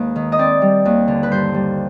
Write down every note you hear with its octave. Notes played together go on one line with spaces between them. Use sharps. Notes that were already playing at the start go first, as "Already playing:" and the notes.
Already playing: D#2 G#3 B4
D#3
D#5
C4 D5
G3
D#2
D3
B4
G2 C5
G3